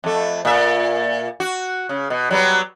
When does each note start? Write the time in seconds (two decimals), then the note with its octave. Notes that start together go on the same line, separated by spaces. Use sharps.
0.04 F2 A3
0.45 A#2 E5
1.40 F#4
1.89 C#3
2.10 B2
2.31 F#3 G3 B3